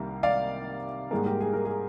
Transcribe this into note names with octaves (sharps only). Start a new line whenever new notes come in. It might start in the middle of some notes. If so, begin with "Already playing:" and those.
Already playing: C2 C3 D#3 G3 A#3
D5 F5
G#2 G3 A#3 G#4
G4 A#4
G#4
A#4
G#4